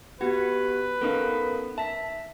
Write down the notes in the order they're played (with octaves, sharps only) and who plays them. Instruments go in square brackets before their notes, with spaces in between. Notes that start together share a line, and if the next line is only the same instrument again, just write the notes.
[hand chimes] B3 G4 [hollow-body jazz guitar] F#4 [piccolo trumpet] B4
[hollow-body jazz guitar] B3 C#4 D#4 [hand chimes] A4 A#4 F5
[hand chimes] E5 B6 [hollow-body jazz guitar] A5